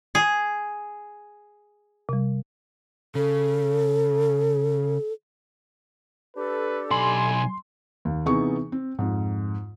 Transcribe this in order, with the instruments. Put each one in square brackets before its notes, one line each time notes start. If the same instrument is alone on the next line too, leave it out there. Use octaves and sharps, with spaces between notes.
[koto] G#4
[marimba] C3 G3
[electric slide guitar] C#3 [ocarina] A4
[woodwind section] D4 G4 A4 [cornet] B4
[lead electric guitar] B1 B5 [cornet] G#5 [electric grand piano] C6
[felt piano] D#2
C3 E3 B3 D#4 G#4 C#6
C4
F2 G#2